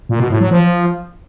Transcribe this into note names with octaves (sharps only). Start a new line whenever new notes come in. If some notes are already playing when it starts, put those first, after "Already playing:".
A#2
B2
A2
F#3
F3